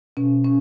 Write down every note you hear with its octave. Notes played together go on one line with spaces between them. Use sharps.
B2 C#4
C#4